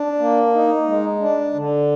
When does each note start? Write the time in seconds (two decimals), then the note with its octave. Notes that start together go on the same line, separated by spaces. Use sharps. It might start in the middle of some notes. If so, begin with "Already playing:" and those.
Already playing: D4
0.19 A#3
0.54 D#4
0.87 G#3
1.20 D4
1.54 D3